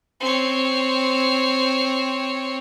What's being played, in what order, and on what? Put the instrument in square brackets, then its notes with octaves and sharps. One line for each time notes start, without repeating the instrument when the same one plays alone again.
[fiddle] C4 C#5